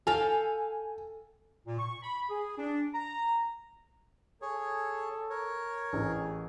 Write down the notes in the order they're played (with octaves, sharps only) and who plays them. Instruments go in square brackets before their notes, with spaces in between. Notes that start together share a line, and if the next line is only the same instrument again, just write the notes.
[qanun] A4 F5 G5 [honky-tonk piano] G#5
[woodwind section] A#2
C#6
B5
G#4
D4
A#5
[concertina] G#4 C#5 [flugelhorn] A4
[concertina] A#4 C#5
[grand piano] A1 [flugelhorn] G#4